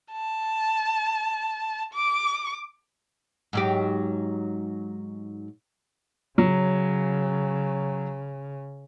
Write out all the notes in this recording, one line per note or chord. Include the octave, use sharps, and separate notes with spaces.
A5
D6
G#2 F#3 G4
C#3 F#3